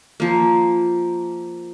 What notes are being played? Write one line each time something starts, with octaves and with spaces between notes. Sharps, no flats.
F3 A#3